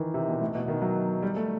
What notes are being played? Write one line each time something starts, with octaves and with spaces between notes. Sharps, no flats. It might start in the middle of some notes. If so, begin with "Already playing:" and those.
Already playing: D#3 E3
C3
B2
A2
B2
D#3
F#3
G3
A3